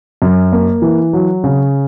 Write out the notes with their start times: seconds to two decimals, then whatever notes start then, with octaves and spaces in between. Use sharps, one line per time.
0.22 F#2
0.52 A#3
0.82 E3
1.13 F#3
1.44 C#3